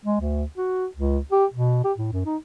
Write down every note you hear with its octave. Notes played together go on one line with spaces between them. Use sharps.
G#3
D2
F#4
C#2
G4
B2
G4
A2
F#2
D#4